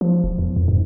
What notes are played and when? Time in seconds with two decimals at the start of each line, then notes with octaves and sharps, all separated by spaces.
0.01 F3
0.24 E1
0.39 E2
0.56 F2
0.68 G#2